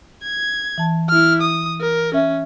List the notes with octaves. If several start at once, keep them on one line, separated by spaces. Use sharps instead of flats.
G#6
E3 A5
E4 F6
D#6
A#4
C#4 E5